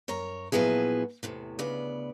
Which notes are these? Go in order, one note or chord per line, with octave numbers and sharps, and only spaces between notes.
F#2 A#4 C#5 A#5
A#2 F3 F#3 B3 E4 G#4
E2 A2 C3
D2 C#3 B3 D5